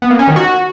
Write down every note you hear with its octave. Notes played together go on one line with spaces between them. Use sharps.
B3
A#3
C#4
D#3
F#4